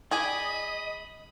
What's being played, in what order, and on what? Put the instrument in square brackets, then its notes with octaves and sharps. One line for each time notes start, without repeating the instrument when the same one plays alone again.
[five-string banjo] G#4 D5 G#5 [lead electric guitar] D#5 [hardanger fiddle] B5